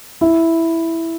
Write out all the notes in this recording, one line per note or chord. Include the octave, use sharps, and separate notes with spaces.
E4